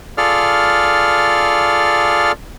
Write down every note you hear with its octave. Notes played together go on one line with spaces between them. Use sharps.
F4 G#4 A4 D5 F6